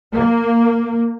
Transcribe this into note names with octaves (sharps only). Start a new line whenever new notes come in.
A#3